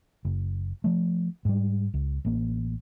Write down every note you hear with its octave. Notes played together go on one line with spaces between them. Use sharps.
F#1
F3 A3
G#2 G3
C#2
A1 A#3